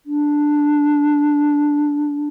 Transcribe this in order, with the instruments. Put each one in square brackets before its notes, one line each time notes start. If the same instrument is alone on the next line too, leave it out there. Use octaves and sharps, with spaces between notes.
[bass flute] D4